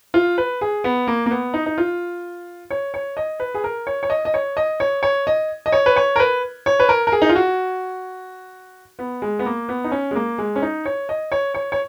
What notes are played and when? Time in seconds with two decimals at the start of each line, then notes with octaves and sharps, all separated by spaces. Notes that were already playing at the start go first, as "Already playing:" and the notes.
0.14 F4
0.38 B4
0.61 G#4
0.84 B3
1.07 A#3
1.26 A#3
1.31 B3
1.54 D#4
1.66 D#4
1.78 F4
2.71 C#5
2.94 C#5
3.17 D#5
3.40 B4
3.55 G#4
3.64 A#4
3.87 C#5
4.03 C#5
4.10 D#5
4.25 D#5
4.34 C#5
4.57 D#5
4.80 C#5
5.03 C#5
5.27 D#5
5.66 D#5
5.72 C#5
5.86 B4
5.96 C#5
6.16 A#4
6.20 B4
6.66 C#5
6.80 B4
6.89 A#4
7.07 A#4
7.12 G#4
7.22 D#4
7.29 F4
7.36 F#4
8.99 B3
9.22 G#3
9.39 B3
9.46 A#3
9.69 B3
9.84 D#4
9.91 C#4
10.11 G#3
10.15 A#3
10.38 G#3
10.56 C#4
10.62 D#4
10.85 C#5
11.09 D#5
11.32 C#5
11.54 C#5
11.72 C#5